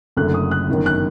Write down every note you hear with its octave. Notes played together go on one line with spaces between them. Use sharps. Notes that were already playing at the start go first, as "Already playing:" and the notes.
F#1 F#2 D3 A3 F#6
D#6
F#6
G1 F#2 D#3
F#6